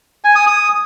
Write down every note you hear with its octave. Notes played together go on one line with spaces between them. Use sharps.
G#5
D#6
D#6